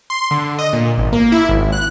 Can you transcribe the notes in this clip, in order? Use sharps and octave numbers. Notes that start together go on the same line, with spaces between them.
C6
D3
D#5
A#2
G#1
A#3
E4
G#1
F#6